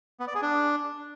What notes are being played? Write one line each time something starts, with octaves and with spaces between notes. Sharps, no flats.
B3
D5
G#4
D4